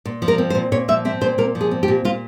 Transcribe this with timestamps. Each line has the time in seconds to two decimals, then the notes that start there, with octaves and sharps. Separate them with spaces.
0.05 A#2
0.22 F3
0.28 A#4
0.38 C4
0.50 C5
0.55 A#2
0.72 A#2 C#5
0.88 F3 E5
1.05 C4 E5
1.21 A#2 C5
1.38 A#2 A#4
1.55 F3
1.61 G#4
1.71 C4
1.83 G4
1.88 A#2
2.05 A#2 F4